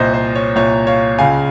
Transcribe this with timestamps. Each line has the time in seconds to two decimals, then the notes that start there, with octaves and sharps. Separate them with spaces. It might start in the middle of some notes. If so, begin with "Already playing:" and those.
Already playing: C2 A#2 C5 D#5
0.14 C5
0.35 C#5
0.56 C2 A#2 C#5
0.87 C#5 F5
1.19 C#2 C#3 F5 G#5